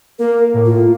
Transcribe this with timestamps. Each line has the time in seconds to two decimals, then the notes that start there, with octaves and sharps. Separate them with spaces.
0.19 A#3 A#4
0.54 A2
0.65 F4